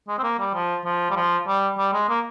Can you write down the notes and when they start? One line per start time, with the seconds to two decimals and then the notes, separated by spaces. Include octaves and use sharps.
0.08 G#3
0.18 C4
0.23 A#3
0.39 G3
0.54 F3
0.85 F3
1.10 G3
1.16 F3
1.47 G3
1.78 G3
1.94 G#3
2.09 A#3